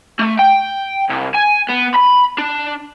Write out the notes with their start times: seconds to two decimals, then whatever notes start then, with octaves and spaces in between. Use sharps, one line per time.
0.19 A3
0.39 G5
1.10 C2
1.35 G#5
1.70 B3
1.96 B5
2.38 D4